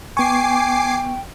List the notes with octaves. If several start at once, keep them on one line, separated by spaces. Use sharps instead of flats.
B3 G5 G#5 C#6 D6 C7